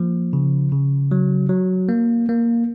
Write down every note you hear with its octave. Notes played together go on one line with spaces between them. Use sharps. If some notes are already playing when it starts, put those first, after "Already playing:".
Already playing: F3 A#3
C#3
C#3
F#3
F#3
A#3
A#3